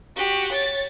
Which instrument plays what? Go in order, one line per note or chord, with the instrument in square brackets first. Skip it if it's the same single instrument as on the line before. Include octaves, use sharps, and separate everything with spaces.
[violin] F#4 G4
C#5 A6